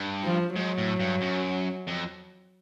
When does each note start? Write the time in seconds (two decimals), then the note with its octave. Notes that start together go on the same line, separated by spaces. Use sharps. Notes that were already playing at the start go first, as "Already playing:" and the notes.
Already playing: G2
0.24 F3
0.56 G#2 F#3
0.78 A2
1.00 G2
1.22 F#2
1.88 F2